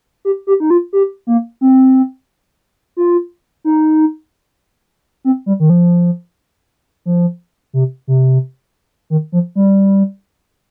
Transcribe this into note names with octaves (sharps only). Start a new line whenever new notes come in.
G4
G4
D#4
F4
G4
A#3
C4
F4
D#4
C4
G3
D#3
F3
F3
C3
C3
D#3
F3
G3